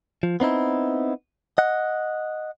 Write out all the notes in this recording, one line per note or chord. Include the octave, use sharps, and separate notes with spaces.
F3
B3 C4 D#4 E4
D#5 F#5